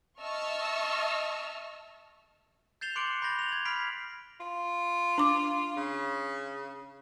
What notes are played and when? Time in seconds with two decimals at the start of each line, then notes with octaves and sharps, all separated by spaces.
0.20 D#5 E5 A5 C#6 E6 F6
2.81 G6 A6 C7 E7 F7 G7
2.96 C6 D6 F#6 C#7 D7 F#7
3.22 B5 G6 A6 A#6 G7
3.39 F7 F#7
3.52 G#6
3.65 B5 F6 B6 C7 D7
4.40 F4
5.18 D4 D6
5.76 C#3